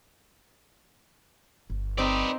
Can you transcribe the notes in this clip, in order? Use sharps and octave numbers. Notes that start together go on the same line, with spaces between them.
G1
C4 D#4 B4 D5